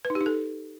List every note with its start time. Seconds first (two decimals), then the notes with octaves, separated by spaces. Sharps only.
0.05 B4
0.10 D#4
0.15 G4
0.21 D#4
0.26 A4